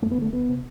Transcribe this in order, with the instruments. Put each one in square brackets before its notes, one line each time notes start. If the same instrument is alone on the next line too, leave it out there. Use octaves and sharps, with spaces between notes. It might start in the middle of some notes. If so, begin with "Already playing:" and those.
[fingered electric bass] F#2 A3
B3
D3 A3
D2 B3
C3